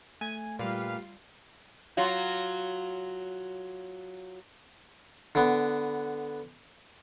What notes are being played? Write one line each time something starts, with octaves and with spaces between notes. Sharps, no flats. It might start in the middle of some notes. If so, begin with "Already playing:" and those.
A3 G#5
A#2 G3 F4 G4 B4 F5
F#3 F4 F#4
D3 B3